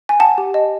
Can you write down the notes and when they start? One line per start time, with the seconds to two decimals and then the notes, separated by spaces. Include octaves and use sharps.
0.09 G#5
0.20 F#5 A5
0.38 G4
0.54 D#5